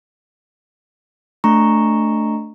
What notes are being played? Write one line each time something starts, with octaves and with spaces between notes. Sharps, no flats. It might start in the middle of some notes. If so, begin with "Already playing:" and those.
A3 D4 A#5 C#6